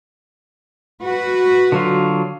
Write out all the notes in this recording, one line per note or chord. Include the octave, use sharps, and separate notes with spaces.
F#4 B4
D3 F#3 F4